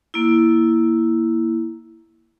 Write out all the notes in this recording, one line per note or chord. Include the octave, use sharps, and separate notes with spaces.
A#3 E4